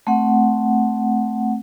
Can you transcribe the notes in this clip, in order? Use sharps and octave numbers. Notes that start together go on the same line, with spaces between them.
A3 C4 F#5